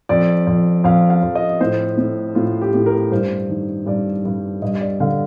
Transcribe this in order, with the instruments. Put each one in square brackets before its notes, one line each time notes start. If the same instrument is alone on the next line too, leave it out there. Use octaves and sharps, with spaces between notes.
[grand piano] F2 D5
F2
F2 F5
F5
F2
D#5
A2 C5
A2
A2 F4
G4
A2
A#4
G2 C5
D#3
G2 D5
G2
G2 D#5
D5
D3 F5